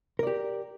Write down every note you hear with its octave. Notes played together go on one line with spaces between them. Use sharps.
G4 A#4 D5